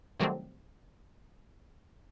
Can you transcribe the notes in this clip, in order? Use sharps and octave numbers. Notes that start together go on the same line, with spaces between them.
C3 D#3 F#3 G3 A3 C4